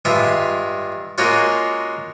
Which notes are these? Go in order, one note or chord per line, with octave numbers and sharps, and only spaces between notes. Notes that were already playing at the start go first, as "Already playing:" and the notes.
G2 G#3 F4 E5
G#3 A#3 C#4 F4 F#4